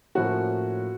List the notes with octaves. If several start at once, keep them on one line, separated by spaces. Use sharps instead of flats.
A2 F3 A#3 C#4 F#4